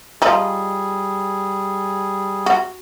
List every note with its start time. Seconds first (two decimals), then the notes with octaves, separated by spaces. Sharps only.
0.22 F3 G3 D#4 G#4
2.46 F#4